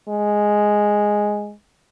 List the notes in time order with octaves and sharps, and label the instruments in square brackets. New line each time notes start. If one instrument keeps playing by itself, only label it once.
[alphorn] G#3